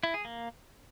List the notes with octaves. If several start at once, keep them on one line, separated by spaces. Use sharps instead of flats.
E4
G#4
A#3